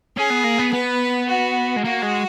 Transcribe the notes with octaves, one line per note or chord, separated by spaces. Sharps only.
C#4 G#4
B3
A#3
B3
B3 B4
F#4
G#3
A#3 F#4
G#3